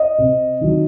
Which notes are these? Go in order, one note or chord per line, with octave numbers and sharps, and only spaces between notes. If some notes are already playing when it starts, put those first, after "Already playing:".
Already playing: D#5
C3
D#3 F#3